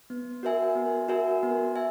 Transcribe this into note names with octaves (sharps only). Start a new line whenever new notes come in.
B3
F#4 A#4 E5 G#5
B3
F#4 A#4 E5 G#5
B3
E5 G#5